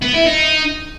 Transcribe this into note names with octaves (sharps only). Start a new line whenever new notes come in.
B3
E4
D#4